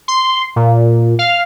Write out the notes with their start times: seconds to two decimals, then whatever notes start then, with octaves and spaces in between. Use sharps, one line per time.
0.08 C6
0.56 A#2
1.19 F5